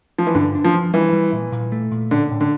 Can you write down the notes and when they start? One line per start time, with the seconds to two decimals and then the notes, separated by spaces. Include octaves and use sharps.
0.18 F3
0.27 E3
0.35 G2 D3
0.55 D4
0.64 F3
0.75 F3
0.94 E3 G3
1.13 G3
1.33 A#2
1.52 A#2
1.72 A3
1.92 A#2
2.11 A2 D3
2.31 A2
2.41 D3